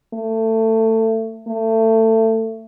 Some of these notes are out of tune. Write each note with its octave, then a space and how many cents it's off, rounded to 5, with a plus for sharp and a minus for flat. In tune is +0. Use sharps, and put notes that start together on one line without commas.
A3 +20
A3 +25